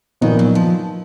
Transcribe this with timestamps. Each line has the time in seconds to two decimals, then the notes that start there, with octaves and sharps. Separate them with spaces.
0.21 A#2 D#3 F3 B3 D#4 A#4
0.39 F#3
0.55 F3